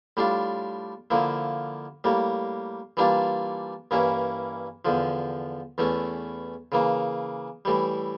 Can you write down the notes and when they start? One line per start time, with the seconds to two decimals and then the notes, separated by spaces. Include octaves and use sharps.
0.17 A2 G3 D4 F4
1.11 D3 F3 A#3 E4
2.04 A2 G3 A#3
2.97 E3 G3 A#3 D4 F4
3.91 G2 E3 A#3 C#4 E4
4.85 E2 D3 F3
5.78 E2 E3 A3 C#4
6.72 C#3 E3 A#3
7.65 A2 E3 G3